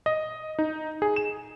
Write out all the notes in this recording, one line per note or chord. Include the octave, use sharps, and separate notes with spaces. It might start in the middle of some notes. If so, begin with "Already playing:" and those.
D#5
D#4
G#4
E7